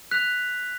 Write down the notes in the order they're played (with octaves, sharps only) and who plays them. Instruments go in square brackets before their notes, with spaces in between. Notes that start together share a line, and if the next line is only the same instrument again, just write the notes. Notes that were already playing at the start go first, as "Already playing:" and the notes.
[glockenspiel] F#6 B6 F7